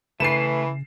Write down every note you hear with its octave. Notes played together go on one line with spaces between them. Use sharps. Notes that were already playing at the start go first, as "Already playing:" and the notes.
C#3 E3 A3 B4 C7 E7